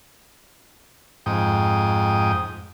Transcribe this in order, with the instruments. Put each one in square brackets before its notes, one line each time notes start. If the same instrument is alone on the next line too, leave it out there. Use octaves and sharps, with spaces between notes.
[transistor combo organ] F2 G#2 G5 D#6